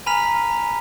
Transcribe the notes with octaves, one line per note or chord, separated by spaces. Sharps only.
G#5 A#5 B5 F6 B6 F7